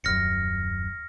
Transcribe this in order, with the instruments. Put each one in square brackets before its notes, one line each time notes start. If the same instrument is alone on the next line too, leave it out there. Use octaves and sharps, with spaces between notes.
[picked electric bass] D#1 F#2 [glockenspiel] F6 A#6 C#7